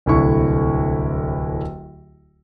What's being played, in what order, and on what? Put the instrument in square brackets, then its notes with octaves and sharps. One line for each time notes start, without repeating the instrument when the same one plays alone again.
[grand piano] D1 C2 D3 E4 C#6